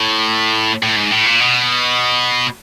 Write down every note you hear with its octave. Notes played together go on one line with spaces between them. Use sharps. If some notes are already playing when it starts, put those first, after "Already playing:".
Already playing: A2
A2
G#2
A2
A#2
B2